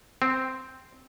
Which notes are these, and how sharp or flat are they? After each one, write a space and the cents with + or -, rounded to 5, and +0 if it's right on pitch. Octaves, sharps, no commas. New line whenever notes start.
C4 -5